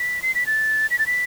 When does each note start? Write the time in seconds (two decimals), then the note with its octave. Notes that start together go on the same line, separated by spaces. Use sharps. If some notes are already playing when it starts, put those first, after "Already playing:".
Already playing: B6
0.22 C7
0.35 B6
0.47 A6
0.90 B6
0.99 A6
1.07 B6